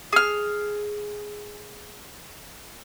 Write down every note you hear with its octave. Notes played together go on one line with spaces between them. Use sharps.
G#4 F6